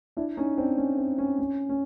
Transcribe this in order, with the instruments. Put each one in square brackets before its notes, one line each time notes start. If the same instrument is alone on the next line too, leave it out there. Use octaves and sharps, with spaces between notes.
[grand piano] D4 E4
C#4 D#4
C4 D4
C#4
C4
C#4
C#4
C#4